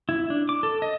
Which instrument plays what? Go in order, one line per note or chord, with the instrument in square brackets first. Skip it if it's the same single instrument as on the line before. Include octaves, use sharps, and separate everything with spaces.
[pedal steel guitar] E4
D4
D6
A4
D#5